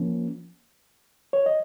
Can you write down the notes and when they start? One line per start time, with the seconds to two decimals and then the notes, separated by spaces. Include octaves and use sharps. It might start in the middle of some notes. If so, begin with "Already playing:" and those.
Already playing: F3 A#3 C#4
1.33 C#5
1.46 D#5